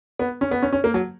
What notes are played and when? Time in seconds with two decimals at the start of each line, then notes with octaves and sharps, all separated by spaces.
0.19 B3
0.41 C#4
0.51 B3
0.62 C#4
0.73 C#4
0.84 A#3
0.94 F#3